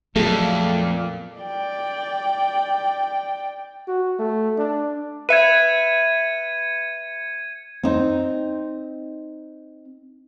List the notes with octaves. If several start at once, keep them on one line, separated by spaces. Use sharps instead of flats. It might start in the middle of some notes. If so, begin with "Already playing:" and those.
F2 A#2 F#3 A3 B3 G#4 A4
D5 G5
F#4
A3
D4
B4 E5 G#6 C#7 D#7
C4 D#4